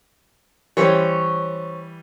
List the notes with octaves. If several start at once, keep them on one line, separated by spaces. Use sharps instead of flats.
E3 G3 C#4 C5 C#5